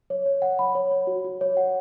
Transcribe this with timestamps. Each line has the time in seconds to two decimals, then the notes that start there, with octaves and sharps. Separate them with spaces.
0.10 C#5
0.26 C#5
0.42 F#5
0.59 B5
0.75 C#5
0.91 C#5
1.07 F#4
1.25 F#4
1.41 C#5
1.57 F#5